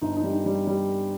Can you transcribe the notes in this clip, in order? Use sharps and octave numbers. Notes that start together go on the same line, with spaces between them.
G1 D#4
D#4
G3
D#4
G3
G3